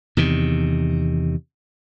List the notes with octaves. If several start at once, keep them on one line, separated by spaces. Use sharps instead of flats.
E2 C3 D#3